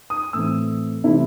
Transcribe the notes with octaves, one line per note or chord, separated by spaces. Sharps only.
D#6
A2 E3 A3 C4 E6
C3 E3 A3 E4